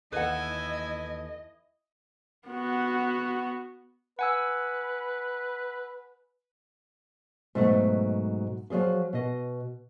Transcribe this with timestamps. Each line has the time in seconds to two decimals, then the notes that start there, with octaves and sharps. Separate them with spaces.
0.12 D#2 E3 E4 A4 B4 D#5 F#5 G#5
2.48 B3 F#4
4.19 B4 F#5 G#5 E6
7.55 G#2 B2 F#3 A3
8.70 F3 F#3 G#3 G#4 F5
9.13 B2 D#5